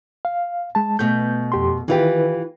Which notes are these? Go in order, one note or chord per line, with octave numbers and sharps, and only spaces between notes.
F5
G#3 A5
B2 A3 G6
F2 G4 C6
D#3 E3 E4 F4 G4 B4